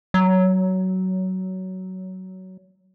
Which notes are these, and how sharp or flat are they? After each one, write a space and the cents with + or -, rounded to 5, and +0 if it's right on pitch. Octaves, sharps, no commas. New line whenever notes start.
F#3 +15